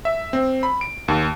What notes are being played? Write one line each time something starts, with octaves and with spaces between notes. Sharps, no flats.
E5
C4
B5
D7
D#2